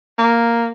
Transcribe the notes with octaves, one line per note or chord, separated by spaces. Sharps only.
A#3